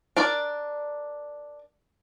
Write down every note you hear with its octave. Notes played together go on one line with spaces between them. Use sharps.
D4 A#4 D5